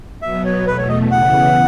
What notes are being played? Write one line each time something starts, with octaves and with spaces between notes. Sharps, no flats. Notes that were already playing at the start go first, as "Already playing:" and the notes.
B2 F#3 B3 E5
C#5
E2 B2 A3 B4
C#5
D#5
C#3 E3 B3 F#5